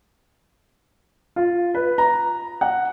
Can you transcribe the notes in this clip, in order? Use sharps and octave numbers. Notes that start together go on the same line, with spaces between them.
F4
B4
A#5
F#5